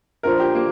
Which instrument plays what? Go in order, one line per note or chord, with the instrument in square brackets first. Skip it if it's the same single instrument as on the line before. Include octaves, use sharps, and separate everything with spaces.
[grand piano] A#2 F3 D4 F4 C5 [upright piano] A#4
[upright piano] G4
A#3